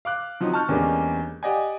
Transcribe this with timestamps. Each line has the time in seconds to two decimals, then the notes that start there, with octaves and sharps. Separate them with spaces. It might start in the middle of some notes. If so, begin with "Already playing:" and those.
0.05 F5 D6 F#6
0.41 F3 F#3 C4 D#4
0.53 A5 C#6 F6 G6
0.69 E2 G3 G#3 A#3 C#4 D4
1.43 G4 D5 D#5 F#5 G#5